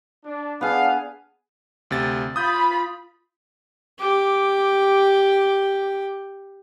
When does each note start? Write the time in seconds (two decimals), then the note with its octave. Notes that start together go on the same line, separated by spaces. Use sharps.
0.25 D4
0.61 B3 D4 G#4 F5
1.91 D2 C3 A6
2.36 F4 B5 D#6 G6
3.99 G4 D6